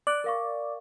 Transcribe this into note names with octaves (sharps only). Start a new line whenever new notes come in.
D5 F#6 D7 F#7
A#4 F5 C#6